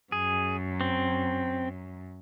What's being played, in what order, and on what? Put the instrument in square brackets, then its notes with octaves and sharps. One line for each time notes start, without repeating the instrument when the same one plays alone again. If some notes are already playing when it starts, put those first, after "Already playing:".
[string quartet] F#2 [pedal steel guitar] G#4
[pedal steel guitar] C4